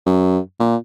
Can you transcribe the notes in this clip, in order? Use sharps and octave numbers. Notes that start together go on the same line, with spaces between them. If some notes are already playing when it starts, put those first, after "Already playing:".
F#2
A#2